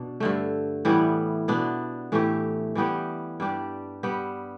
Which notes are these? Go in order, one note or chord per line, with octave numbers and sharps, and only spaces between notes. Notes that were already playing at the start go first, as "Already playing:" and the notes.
Already playing: B2 D4
G2 D3 A3
A2 E3 G3 B3
B2 B3 D4
A2 E3 A3 G4
E3 G3 B3 G4
G2 G3 D4 G4
G3 B3 G4